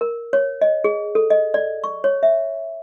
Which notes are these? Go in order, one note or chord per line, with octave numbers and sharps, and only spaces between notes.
A#4
C#5
D#5
G#4
A4
D#5
D5
C#6
C#5
E5